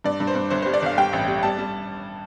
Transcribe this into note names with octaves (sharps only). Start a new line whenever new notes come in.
G2 D5
G2
C5
G2
G1 C5
C5
G3
D5
G1 F5
G3 G5
A1
G3
G3 A5
G3